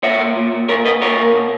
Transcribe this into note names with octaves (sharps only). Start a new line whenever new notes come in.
A#2 C#5 E5
A#2
A#2
A#2
A#2 A#4 C#5
A#2 B4 D#5
A#2 A#4 C#5
A#2
B2